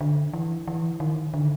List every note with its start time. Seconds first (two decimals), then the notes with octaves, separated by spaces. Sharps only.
0.01 D3
0.33 E3
0.68 E3
1.00 D#3
1.34 D3